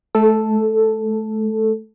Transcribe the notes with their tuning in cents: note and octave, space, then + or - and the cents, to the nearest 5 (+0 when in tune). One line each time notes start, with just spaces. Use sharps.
A3 -30 A4 +0